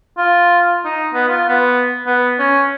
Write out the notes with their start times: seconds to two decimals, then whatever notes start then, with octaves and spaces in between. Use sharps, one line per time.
0.18 F4
0.85 D#4
1.13 B3
1.28 F4
1.49 B3
2.07 B3
2.39 C#4